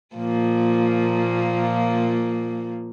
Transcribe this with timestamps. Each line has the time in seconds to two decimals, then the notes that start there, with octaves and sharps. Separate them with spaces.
0.16 A#2 F3 A#3